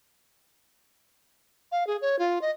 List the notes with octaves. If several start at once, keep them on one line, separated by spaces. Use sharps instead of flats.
F5
G#4
C#5
F4
D#5